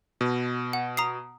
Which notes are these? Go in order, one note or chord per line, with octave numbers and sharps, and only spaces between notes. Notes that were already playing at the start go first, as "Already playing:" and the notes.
B2
F#5
A#5 D#6 C7